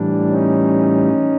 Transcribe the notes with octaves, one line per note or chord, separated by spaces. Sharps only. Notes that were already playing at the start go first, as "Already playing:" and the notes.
Already playing: A2 E3 G3 D4
C#4 D#4